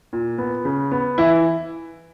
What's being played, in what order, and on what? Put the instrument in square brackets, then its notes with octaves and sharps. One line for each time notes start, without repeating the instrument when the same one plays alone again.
[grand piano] A#2
B3
C#3
B3
E3 E4